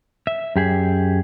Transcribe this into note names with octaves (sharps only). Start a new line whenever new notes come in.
E5
F#2 G4 G#4